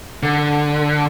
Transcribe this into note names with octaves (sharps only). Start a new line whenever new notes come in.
D3